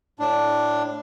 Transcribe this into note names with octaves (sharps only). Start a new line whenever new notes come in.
A2 D4